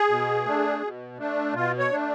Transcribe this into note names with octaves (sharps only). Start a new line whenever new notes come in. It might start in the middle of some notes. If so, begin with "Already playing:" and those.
Already playing: G#4
B2
A3 D4
B2
A3 D4
B2 F4
C#5
A3 D4